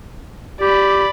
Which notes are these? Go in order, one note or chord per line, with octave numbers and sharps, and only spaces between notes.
G4 D5 B5